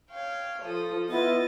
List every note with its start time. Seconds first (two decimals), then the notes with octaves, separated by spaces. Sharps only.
0.11 C#5 F5 G5
0.62 F3 A4 D#6
1.09 B3 E4 F4 D#5 A6